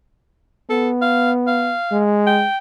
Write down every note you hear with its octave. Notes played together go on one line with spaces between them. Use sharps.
B3 A4
F5
F5
G#3
G5